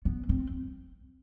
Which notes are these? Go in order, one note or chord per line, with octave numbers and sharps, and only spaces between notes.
B3
C4